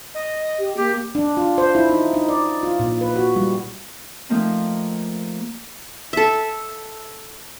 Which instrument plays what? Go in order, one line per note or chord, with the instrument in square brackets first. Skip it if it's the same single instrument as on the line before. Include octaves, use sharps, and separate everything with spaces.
[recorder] D#5
[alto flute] G4
[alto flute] A#3 [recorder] G4
[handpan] D4
F4
C5
E4
D#4
D#4
D5
F4
A#2
B4
F#4
G3
[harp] F3 A3 A#3 C4 D#4 F4
[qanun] A4 E5